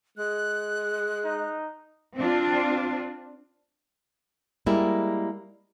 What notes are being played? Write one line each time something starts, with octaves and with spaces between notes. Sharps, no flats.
G#3 F#6
D#4
C4 D4 F4
G3 G#3 A#3 E4